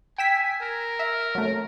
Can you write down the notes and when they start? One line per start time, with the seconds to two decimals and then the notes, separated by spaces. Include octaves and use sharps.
0.18 G5 G#5 E6 B6
0.60 A#4
0.99 E5
1.35 F#3 A3